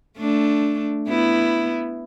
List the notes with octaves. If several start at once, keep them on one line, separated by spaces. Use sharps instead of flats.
A3 D4
B3 E4